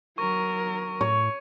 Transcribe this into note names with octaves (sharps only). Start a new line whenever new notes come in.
F#3 A#4 C#6
A2 C#5